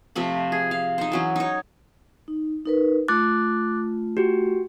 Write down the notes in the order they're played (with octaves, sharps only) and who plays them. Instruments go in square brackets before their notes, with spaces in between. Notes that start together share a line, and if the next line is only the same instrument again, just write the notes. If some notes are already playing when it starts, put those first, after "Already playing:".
[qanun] C3 F3 A3 B5
G#4
F5
D#4 C5
E3 F#3 C#4
D#4 C#5
[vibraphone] D#4
D#4 A#4 B4
[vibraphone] A3 F4 [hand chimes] D6 F#6 A6
[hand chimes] F#4 G4